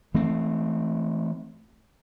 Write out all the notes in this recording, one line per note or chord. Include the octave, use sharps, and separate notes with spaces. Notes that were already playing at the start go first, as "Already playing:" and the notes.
E3 A3 C4